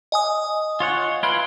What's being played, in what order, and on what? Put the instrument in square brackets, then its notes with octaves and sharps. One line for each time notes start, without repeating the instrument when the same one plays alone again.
[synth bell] D#5 G#5 D#6
[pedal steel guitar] F4 C#5 F#5
[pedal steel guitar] E4 F4 B4 [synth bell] G#6 D7 G7